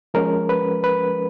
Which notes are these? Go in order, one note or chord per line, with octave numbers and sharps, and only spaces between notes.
F3 G#3 C#4 A#4
B4
B4